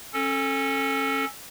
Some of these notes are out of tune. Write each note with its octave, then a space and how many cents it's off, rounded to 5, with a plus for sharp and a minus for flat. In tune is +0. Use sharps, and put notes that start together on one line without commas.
C#4 -25 A4 +0